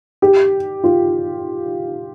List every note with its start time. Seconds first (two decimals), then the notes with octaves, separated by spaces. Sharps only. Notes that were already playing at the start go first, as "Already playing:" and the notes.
0.22 G4
0.84 F4